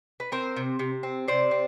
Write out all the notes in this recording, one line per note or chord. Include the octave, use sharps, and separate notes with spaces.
B4
C4 A#4 C5
C3
C3
C4
C3 C5 D5
C4